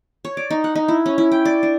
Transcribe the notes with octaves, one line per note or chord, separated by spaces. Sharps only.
C#5
D5
D#4
F#5
D#4
E4
C#4
E4
G5
D5
D4